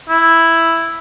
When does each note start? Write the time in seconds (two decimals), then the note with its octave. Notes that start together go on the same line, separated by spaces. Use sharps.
0.09 E4